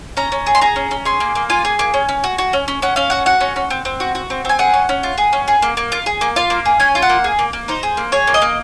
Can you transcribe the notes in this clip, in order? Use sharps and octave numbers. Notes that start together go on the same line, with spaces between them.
C#4 A#5
C#4
G#4
C6
G#4 A#5
C#4
C#4
G#4 C6
A#3
A#3
F4 G#5
G#4
A#3
C#4
C#4
F#4
F#4
C#4
C#4
C#4 F#5
C#4 F5
F#4 F#5
F#4 F#5
C#4
C#4
C4
C4
F#4
F#4
C4
C4 G#5
G#4 F#5
C#4
C#4
F4
G#4
C#4
G#4
A#3
A#3
F4
G#4
A#3
F4 F5
A#3
G#4
C#4 G#5
F4
F#5
A#3
G#4
A#3
A#3
D#4 C5
G#4
A#3
G#4 C#5
A#3
D#5
A#3